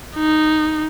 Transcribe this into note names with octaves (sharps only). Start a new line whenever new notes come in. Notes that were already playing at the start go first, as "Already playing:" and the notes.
D#4